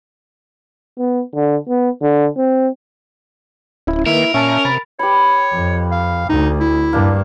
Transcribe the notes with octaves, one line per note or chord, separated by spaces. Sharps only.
B3
D3
B3
D3
C4
D1 C#4 E4 E5
D#3 A#3 E4 A#4 B4
A#2 C#4 E5 A5
C3 B5 A6
G4 B4 C#5 B5
F2
F5
D2 D#4
E4
G2 A#3 D4